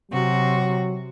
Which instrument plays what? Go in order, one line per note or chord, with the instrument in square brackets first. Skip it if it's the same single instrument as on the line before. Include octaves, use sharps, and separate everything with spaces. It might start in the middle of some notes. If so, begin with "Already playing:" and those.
[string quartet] C3 F#4 [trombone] F#3